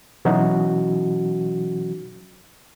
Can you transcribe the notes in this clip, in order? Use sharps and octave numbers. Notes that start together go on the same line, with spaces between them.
B2 E3 F#3 C#4 D#4 F#4